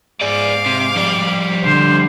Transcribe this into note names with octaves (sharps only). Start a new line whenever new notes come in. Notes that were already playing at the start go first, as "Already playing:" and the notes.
G#2 G#4 D5 F5 D6
C3
F2 G3
D3 C5